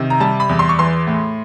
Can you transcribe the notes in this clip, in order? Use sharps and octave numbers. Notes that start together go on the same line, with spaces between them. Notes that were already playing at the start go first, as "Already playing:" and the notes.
Already playing: C3 D#3
A#5
G3 A5
B5
E2
C6
C#6
E3 C6
A2